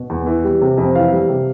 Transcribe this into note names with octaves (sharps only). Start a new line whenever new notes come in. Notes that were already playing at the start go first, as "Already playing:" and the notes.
Already playing: B2
E2
E3
G3
C3
F2
E3 F5
G3
C3